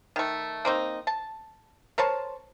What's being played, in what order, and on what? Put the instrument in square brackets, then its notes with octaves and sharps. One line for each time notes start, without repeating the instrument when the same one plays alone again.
[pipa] D#3 A3
A#3 C4 D#4
A5
A#4 C5 C#5 A5